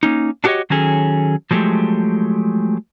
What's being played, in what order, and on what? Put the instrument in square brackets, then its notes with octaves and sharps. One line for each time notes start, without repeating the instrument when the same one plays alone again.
[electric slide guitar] A#3 C#4 D#4
D4 F#4 G4 A#4 C#5 D#5
D#3 F#3 C#4 G#4 A4
F3 F#3 G#3 A3 G4